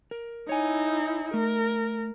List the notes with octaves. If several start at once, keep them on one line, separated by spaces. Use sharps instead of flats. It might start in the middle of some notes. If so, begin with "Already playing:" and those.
A#4
D#4 E4 C#5 G#5
A3 A#4